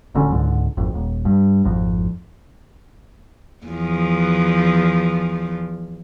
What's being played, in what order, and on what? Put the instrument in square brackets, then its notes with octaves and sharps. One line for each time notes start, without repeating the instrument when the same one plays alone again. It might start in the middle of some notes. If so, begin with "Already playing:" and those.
[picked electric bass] D1 D2 D3 C#4
C#2 G#2 D3
G#1 F2
D#1
G2
G#1 F2
[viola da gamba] E2 F3